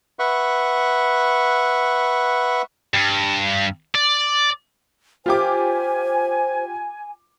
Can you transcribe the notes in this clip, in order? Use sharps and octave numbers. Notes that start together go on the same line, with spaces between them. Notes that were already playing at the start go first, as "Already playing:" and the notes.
B4 E5 F#5 C#6
G2
D5
F4 G4 C5 G#5 D6